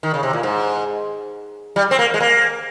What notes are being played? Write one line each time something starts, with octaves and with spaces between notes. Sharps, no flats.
D#3
C#3
C3
A#2
G#2
G3
C4
A#3
G#3
A#3